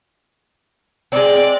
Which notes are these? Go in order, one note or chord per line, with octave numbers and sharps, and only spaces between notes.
G#3 C4 D5